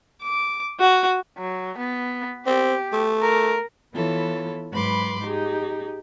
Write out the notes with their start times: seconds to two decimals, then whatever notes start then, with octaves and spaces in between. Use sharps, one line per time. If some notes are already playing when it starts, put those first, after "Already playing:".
0.22 D6
0.80 F#4
1.38 F#3
1.78 B3
2.46 C4 G4
2.93 A3
3.22 A#4
3.92 E3 B3 E4 F4 A4 C#5
4.71 G#2 F#3 B4 B5 C6 D6
5.22 D#4 G4 G#4